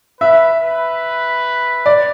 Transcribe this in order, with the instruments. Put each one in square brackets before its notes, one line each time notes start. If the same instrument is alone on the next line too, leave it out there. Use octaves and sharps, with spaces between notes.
[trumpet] B4 [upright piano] E5
[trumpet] B4
[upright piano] D5